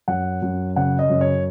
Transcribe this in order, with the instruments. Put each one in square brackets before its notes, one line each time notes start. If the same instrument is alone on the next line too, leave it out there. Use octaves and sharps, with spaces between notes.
[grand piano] F#2 F#5
F#2
C#3 F#5
D#5
F#2
C#5